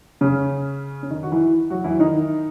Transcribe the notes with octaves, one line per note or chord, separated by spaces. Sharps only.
C#3 C#4
C#4
D#3 D#4
F#4
E3 E4
F#3 F#4
E3 E4
D#3 D#4